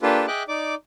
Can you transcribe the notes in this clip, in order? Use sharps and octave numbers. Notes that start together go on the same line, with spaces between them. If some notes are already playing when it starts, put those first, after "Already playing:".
A#3 D4 F4 G4 A4 B4
G#4 D#5 E5 G5 D6 F#6
D#4 D5 D6